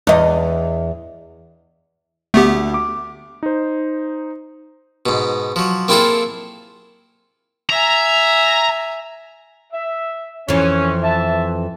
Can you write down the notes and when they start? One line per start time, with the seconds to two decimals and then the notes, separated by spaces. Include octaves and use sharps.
0.07 E2 D#5
2.34 D2 A3 B3 G4
2.74 D6
3.43 D#4 C5
5.06 G#2 B2
5.56 F3 F#3
5.88 A#3 C4 E4 F4 G#4 A4
7.70 E5 G#5 A#5
9.72 E5
10.49 F2 E3 C#4
11.03 E5 A5